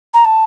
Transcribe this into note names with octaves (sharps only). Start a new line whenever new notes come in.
A#5
A5